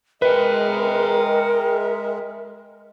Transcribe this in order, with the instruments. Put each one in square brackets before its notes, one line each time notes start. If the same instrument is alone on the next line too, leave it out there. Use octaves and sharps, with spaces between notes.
[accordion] G#3 [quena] A#4 [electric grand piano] B4 [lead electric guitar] E5 G5